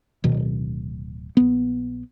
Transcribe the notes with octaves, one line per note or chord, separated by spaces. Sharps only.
D1 B2 D#3
A#1 B3